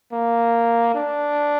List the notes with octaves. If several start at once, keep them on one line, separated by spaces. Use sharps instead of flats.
A#3
D4